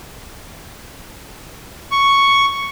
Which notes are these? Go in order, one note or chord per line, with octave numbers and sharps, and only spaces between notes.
C#6